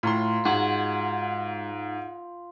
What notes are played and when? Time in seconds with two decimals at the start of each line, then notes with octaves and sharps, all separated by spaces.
0.03 A2 F4 A#5 C6
0.45 G#2 G#3 F#4